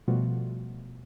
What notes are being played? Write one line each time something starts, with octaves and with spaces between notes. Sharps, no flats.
B2 F3 G3 A3 F4 F#4